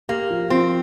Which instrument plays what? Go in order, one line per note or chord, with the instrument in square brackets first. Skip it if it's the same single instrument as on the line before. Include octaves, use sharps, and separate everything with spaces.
[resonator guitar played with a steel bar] A#3 [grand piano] G4
[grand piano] F3
[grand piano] F3 [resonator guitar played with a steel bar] C4